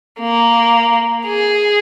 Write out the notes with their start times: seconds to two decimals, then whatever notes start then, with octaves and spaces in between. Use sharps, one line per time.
0.20 A#3
1.26 G#4